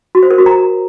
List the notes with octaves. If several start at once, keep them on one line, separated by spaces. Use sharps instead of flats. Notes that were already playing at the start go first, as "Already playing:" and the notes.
F#4
C5
A#4
F#4
A#5